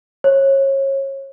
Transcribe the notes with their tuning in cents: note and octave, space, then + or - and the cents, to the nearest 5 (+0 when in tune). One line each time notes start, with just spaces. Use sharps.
C#5 -30